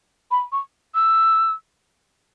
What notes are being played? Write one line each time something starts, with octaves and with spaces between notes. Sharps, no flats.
B5
C#6
E6